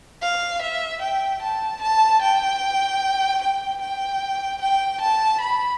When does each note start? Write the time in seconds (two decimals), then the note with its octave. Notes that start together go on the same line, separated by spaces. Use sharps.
0.21 F5
0.62 E5
1.01 G5
1.42 A5
1.82 A5
2.22 G5
3.42 G5
3.81 G5
4.61 G5
5.01 A5
5.41 B5